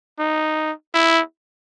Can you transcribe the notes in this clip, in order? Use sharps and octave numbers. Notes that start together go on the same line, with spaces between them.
D#4
E4